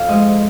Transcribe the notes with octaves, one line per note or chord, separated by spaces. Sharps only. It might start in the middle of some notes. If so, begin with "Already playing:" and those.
Already playing: F2 F5
G#2 F3 G#3 D#5